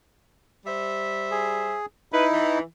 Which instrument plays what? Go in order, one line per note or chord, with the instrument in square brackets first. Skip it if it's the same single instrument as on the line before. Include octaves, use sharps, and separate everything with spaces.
[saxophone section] G3 C5 E5
[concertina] G#4
[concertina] D#4 E4 [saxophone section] B4
[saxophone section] E3